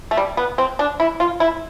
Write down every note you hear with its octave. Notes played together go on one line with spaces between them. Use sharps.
A3
G3
B3
C4
D4
E4
F4
E4